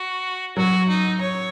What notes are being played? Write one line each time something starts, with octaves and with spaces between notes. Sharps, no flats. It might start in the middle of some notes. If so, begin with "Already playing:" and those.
Already playing: F#4
F#3 F#4
D#4
C#5